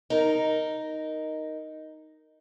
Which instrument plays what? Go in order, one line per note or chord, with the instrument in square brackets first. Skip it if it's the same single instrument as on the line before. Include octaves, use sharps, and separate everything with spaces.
[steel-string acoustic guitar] D#4 A#4